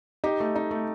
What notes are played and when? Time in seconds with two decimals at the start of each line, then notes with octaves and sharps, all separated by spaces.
0.24 D#4 G4
0.40 A3
0.56 D#4
0.71 A3